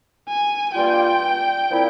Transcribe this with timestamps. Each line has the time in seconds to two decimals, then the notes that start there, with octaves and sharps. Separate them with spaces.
0.28 G#5
0.75 G2 G3 A#3 F4 G5
1.70 A#2 F3 C4 E4